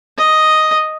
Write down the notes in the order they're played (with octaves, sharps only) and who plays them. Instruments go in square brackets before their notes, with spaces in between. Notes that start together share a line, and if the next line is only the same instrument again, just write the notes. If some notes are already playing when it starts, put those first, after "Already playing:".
[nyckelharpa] D#5